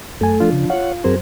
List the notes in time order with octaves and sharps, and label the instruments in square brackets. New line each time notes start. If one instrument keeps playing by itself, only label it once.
[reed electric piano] F#2 G#5 [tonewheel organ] A3 A4
[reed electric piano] F3 D4 F4
[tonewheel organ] C#3
[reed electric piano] F4 F5 [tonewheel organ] C#5 F#5
[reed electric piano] F#2 F#3 C5 [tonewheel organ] C4 G#4 A#4